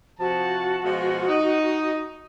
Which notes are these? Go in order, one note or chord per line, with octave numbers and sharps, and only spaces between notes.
C3 F3 F#4 A5
B2 F3 G#3
D#4